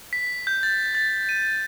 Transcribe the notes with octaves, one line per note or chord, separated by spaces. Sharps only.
B6
G6
A6
A6
D#7